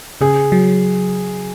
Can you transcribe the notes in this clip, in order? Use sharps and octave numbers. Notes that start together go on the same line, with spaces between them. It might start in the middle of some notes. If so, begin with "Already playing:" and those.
C#3 G#4
F#3